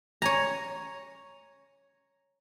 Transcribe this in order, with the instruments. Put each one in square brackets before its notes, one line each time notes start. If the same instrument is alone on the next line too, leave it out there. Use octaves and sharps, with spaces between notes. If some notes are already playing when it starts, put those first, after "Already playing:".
[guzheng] C#5 G#5 A#5